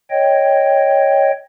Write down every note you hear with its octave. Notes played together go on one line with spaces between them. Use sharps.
C#5 D#5 G5